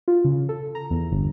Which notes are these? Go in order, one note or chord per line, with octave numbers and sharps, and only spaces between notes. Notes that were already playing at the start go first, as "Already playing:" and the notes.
F4
C#3
A4
A#5
E2
G1